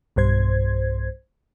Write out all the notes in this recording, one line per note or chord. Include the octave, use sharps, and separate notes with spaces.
B1 G2 C5 G#6